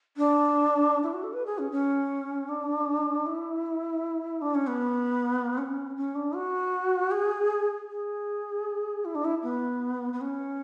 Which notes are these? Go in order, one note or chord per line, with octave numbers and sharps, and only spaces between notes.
D4
E4
F#4
A4
B4
G#4
C#4
C#4
D4
E4
D4
C#4
B3
C#4
C#4
D4
F#4
G#4
G#4
E4
D4
E4
B3
B3
C#4